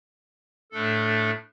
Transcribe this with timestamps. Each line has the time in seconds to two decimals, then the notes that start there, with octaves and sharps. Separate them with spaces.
0.72 A2 A3 D4 A4